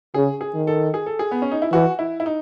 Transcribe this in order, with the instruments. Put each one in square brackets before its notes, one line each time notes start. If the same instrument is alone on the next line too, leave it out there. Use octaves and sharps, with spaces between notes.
[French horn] C#3 [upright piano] G#4
[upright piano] G#4
[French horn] D#3
[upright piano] A4
G#4
A4
G#4
B3
C#4
D#4
E4
[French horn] E3 [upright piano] F#4
[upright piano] E4
E4
D#4